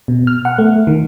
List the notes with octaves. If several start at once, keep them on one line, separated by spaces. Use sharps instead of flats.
B2
F6
F#5
A3
D#3